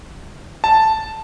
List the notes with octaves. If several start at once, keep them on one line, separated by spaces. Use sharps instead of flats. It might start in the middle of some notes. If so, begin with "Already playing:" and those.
A5